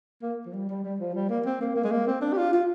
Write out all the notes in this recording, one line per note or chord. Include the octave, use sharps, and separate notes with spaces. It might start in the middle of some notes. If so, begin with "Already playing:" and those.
A#3
F3
G3
G3
G3
F3
G3
A#3
C4
A#3
A#3
G#3
A#3
C4
D4
G4
F4
F4